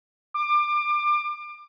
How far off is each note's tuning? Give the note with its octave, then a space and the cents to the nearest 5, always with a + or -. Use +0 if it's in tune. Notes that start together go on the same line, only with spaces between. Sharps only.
D6 +25